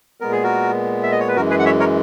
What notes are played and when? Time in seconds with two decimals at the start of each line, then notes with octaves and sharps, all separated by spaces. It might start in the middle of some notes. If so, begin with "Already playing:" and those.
0.21 A#2 G#3 B3 A#4
0.32 G#4
0.43 F#4 A#4
1.03 E5
1.11 D#5
1.20 C#5
1.28 B4
1.36 F#2 E3 G#3 F#4 A#4
1.50 G#4 B4
1.59 F#5
1.65 C#5 E5
1.79 A#4 C#5